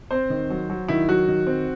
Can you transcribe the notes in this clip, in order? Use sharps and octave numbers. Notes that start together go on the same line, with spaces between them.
C4 C5
D#3
F#3
F#3
D#3 E4
F#3 F#4
D#3
C4